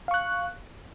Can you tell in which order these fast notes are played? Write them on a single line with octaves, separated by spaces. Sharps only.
F5 C#6 F#6